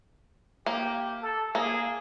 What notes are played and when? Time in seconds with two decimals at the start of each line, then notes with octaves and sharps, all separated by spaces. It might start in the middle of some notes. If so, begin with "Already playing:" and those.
0.66 A#3 G4
1.22 A4
1.55 A#3 G#4